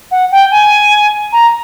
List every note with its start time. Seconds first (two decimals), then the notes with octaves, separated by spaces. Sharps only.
0.11 F#5
0.32 G5
0.51 G#5
1.33 A#5